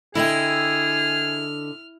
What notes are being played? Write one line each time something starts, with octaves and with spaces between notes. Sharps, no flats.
D3 E4 G#4 D#5 G5 F6